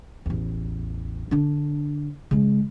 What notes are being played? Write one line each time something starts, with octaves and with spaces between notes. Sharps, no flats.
A1 E2
D3 D4
C#3 G#3